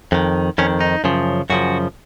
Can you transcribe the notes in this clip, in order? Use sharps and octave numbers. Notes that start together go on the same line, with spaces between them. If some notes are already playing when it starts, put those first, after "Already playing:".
F2 D#3
F2 D#3 C#4
D#4
F#2 C#3 F3
F#2 C#3 F3 F#4